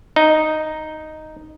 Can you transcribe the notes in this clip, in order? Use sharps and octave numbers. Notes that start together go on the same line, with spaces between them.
D#4